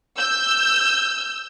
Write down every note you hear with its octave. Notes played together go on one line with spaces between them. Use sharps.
E6 G6